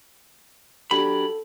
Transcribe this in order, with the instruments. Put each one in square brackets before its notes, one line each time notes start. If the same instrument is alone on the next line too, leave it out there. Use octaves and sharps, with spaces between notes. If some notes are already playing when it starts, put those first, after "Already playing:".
[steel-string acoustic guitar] F#3 D4 G4 [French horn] A4 [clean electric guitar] B5